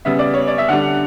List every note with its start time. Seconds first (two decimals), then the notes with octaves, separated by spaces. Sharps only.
0.05 C#3 G3 B3 E5
0.19 D5
0.34 C#5
0.48 D5
0.58 E5
0.68 D3 G3 D4 F#5